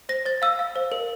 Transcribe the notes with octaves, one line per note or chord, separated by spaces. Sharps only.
C5 A#6
C5 A6
F5 E6
F5
C5
A#4